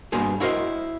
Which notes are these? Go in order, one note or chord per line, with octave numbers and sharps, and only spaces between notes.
G2 B2 A#3 G#4 C5
E4 F#4 A#4 C5 D#5